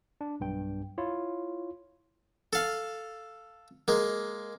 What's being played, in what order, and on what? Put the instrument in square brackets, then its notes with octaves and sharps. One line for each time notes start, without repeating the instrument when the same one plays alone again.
[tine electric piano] D4
B1 G2 G5
E4 F4 C#5
[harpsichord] A4 F5
G#3 A#3